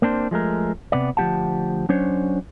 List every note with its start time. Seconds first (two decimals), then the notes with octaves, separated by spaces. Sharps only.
0.02 A#3 C4 D4 C5
0.31 F3 G#3 A3 A#4
0.92 C3 B3 D5
1.17 D2 F3 B3 G4 F#5 A5
1.89 F#3 C#4 D4 C5 C#5